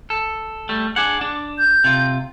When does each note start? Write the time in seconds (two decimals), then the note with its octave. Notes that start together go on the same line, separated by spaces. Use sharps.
0.10 A4
0.69 G3 A3
0.96 D4 G#4 F#5 D6
1.21 D4
1.58 G6
1.84 C3 F4